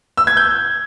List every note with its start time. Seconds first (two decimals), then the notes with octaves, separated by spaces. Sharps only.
0.17 E6
0.27 G#6
0.37 G6